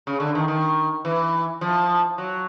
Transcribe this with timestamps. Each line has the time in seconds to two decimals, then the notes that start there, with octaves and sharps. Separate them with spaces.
0.07 C#3
0.20 D3
0.35 D#3
0.48 D#3
1.05 E3
1.61 F3
2.18 F#3